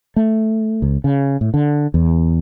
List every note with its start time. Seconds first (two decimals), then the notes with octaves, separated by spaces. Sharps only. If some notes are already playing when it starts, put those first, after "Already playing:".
0.16 A3
0.82 C#2
1.04 C#3
1.41 A2
1.54 D3
1.94 E2